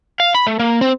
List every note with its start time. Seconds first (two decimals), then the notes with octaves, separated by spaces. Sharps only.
0.20 F5
0.35 B5
0.47 A3
0.60 A#3
0.81 C4